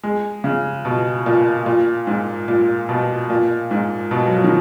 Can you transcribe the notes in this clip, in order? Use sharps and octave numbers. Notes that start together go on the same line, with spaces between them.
G#3
C#3
B2
A#2
A#2
G#2
A#2
B2
A#2
G#2
B2
F#3
F3
D#3